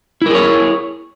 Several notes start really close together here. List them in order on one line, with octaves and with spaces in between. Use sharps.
E4 A#4 G#4 C#5